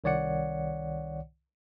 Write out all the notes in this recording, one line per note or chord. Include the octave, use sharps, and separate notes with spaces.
C2 D#3 C#5 D5 F#5 C#7